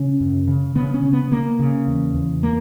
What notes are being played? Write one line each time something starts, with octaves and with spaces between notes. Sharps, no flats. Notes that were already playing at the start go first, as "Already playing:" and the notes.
Already playing: C#3 C#4
F#2
C#3
C#3 B3
C#4
C#3
B3
C#3 A#3
C#3
E2
E2
A#3